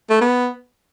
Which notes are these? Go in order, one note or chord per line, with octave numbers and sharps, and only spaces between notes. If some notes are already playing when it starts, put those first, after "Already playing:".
A3
B3